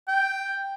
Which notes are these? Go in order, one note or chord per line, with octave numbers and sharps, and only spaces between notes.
G5